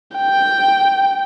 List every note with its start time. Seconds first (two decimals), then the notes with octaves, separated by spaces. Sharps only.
0.17 G5